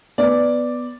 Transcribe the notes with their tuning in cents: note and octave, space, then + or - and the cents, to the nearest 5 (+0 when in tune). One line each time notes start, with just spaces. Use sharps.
B3 +5 D5 +0